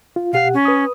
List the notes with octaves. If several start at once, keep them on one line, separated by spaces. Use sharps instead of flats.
F4
B2 G4 F5 F#5
C#4
B4 D#6